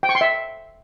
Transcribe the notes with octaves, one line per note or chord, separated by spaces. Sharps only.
G5
C#6
C6
E5